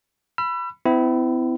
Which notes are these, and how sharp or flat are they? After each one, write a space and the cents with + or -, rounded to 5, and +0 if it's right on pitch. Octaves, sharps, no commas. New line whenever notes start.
B5 +0 E6 +40
C4 -45 E4 +0